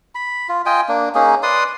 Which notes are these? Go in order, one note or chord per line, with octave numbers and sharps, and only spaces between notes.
B5
F4
F4 D#5 G5 G#5
A#3 D4
A#3 C#4 D#4 G#4
B4 D5 C6 D#6